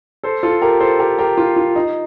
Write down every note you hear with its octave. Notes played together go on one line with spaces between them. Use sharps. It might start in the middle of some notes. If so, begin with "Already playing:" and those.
A4 C5
F4 A4
G4 A#4
A4 C5
G4 A#4
G4 A#4
F4
F4
D#4